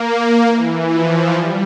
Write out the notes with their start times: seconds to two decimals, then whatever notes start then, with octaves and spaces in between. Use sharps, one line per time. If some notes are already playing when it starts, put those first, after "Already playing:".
Already playing: A#3
0.47 E3
0.90 F3
1.34 G3